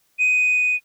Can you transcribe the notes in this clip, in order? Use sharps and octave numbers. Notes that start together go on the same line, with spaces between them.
D#7